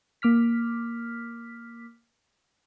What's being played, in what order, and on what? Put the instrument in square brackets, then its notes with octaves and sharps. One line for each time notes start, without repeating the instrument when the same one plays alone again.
[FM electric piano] A#3 D6 F6 B6